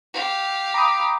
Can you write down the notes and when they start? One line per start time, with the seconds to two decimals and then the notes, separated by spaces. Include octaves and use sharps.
0.14 G4 F5
0.74 A#5 B5 D6 D#6